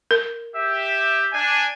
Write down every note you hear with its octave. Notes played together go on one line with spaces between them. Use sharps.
A#4
G4 E5
D4 G#5